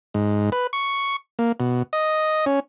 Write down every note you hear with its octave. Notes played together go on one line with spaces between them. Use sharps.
G#2
B4
C#6
A#3
B2
D#5
C#4